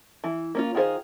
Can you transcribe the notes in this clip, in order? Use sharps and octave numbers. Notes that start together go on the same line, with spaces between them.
E3
A#3 C#4 F4
D#3 F4 G#4 C5